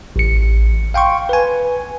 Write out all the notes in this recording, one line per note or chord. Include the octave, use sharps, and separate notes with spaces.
A1 C#7
F5 G5 C6 C#6
B4 G#5